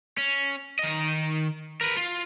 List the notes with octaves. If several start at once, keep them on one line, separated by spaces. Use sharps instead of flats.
C#4
D#3 D#5
A#4 B4
F4